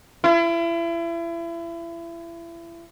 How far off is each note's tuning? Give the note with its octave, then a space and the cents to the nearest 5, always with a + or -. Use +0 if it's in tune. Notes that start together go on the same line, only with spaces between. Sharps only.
E4 +35